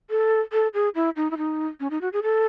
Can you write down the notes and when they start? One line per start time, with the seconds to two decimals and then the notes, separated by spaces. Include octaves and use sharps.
0.10 A4
0.53 A4
0.74 G#4
0.95 E4
1.16 D#4
1.31 E4
1.38 D#4
1.80 C#4
1.91 D#4
2.01 F#4
2.13 G#4
2.23 A4